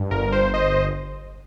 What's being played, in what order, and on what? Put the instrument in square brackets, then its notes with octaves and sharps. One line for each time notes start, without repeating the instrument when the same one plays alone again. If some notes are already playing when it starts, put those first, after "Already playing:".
Already playing: [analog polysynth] G2
G1 A#4
C5
C5 D#5